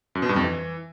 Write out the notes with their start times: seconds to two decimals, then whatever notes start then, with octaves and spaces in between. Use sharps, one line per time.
0.15 F#2
0.22 B2
0.29 G2
0.36 F2
0.43 E3